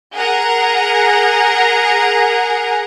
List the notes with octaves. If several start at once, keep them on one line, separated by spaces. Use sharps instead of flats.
G#4 A#4 F#5 A#5